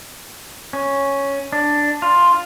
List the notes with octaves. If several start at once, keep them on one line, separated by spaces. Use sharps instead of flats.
C#4
D4
F4